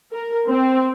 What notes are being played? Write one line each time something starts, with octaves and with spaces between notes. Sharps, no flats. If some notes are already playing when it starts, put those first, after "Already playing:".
A#4
C4